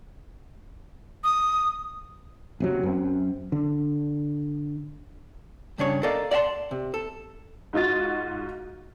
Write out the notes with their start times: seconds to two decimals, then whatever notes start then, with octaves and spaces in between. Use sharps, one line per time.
1.24 D#6
2.60 F#1 C3 F#3
2.83 F#2 C4
3.52 D3
5.78 G2 C#3 D4 C#5
6.03 A4 A#4 D5 D#5 F5
6.31 D5 E5 F#5 A5 C6
6.71 C3
6.94 A4
7.73 G#2 D#4 F4 F#4 A6